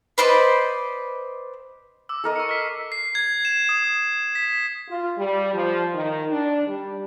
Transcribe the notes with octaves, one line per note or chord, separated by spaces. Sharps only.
B4 C5 D5 D#5
D6 E6
A4 A#4 D#5
C#6 C#7
F6 B6 C7
C7
G#6
E7
D#6
B6
F4
G3
F3
D#3
D4
G3